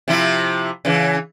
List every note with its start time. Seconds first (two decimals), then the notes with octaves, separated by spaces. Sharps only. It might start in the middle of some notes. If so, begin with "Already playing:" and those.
0.08 C3 F3 E4
0.85 C#3 E3